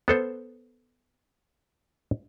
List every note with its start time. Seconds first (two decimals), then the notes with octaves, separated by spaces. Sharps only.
0.08 B3 A4 C5